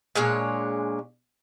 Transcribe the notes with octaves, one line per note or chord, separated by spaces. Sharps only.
A#2 G#3 D4 C#5